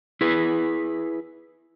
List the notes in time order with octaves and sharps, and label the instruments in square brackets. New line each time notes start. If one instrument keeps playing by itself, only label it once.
[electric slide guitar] E4 G#4 B4